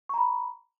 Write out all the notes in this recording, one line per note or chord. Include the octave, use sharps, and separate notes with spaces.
A#5 B5 C#6